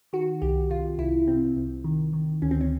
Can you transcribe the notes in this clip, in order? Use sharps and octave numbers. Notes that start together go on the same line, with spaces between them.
D#3 F#4
C2 G4
C3 F4
C2 E4
C3 C4
C2
D#3
D#3
D2 C#4
C4
C#4